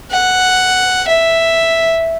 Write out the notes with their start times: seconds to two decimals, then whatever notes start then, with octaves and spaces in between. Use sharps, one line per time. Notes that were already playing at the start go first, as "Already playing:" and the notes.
0.11 F#5
1.08 E5